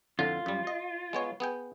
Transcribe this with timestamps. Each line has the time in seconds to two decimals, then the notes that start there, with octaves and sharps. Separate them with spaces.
0.19 F2 A2 D3 F4
0.46 F#2 G3
0.67 D#5
1.13 G#3 B3 C#5
1.40 B3 G#4 G5